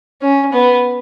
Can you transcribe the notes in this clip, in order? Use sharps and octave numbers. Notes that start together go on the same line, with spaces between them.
C#4
B3